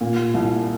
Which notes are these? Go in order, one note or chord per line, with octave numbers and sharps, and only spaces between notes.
A#2
C2